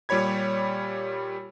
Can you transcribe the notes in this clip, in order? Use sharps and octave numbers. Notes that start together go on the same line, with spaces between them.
A#2 G3 G4 C#5 B5 G#6